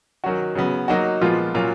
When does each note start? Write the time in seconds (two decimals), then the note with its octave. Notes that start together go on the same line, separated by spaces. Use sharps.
0.24 D#3 F#3 C#4 F#4
0.55 C#3 F#3 B3
0.88 F#3 A#3 D#4 F#4
1.21 A#2 F3 G#3 B3 F4
1.54 A#2 F#3 C#4 F4